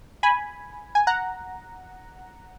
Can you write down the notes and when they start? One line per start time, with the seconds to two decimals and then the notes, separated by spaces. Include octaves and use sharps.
0.23 G#5 B5
0.95 G#5
1.07 F#5 A#5